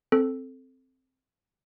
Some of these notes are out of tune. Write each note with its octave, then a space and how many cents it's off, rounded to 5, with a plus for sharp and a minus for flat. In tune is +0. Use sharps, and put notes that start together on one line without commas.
C4 +0 A4 +0